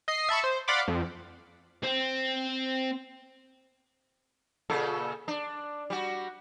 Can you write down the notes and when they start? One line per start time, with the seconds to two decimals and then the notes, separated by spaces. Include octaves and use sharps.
0.08 D#5 C7
0.29 E5 A5 B5 C#6
0.44 C5
0.68 D5 F5 F#5 B5 C6 D6
0.88 F2
1.84 C4
4.70 A#2 C#3 A4
5.28 D4
5.90 G3 F#4